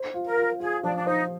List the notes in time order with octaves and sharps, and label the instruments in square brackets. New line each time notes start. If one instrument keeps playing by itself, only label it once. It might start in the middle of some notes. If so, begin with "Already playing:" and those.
Already playing: [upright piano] C5
F4
[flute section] A#4
[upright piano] F4
[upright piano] F4 [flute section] G#4
[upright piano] F3 [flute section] D4
[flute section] D4
[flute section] D#4 [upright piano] C5